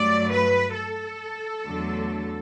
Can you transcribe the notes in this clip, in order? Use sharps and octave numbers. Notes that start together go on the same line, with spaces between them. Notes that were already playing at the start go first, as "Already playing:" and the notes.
Already playing: G2 F#3 A3 D5
B4
A4
E2 D3 F#3 A3